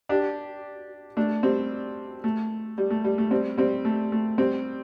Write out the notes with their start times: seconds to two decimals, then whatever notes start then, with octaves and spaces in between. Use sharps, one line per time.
0.09 D4 G4
1.17 A3 D4
1.43 G3 C4
2.24 A3
2.78 G3
2.90 A3
3.04 G3
3.18 A3
3.31 G3 C4
3.57 G3 C4
3.85 A3
4.12 A3
4.38 G3 C4